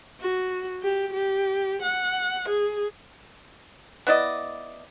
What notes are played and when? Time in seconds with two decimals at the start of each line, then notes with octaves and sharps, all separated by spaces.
0.21 F#4
0.83 G4
1.13 G4
1.82 F#5
2.48 G#4
4.07 B3 E4 D5 D#5